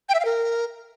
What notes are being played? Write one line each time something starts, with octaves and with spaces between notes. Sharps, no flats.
G5
E5
F5
A#4